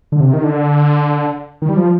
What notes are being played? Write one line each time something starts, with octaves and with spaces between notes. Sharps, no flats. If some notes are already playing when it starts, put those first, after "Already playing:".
D3
C3
D#3
D3
D#3
G3
F3